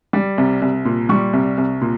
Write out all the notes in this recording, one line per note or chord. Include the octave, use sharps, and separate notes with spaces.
G3
C2
C2
A#2
G3 C#6
C2
C2
A#2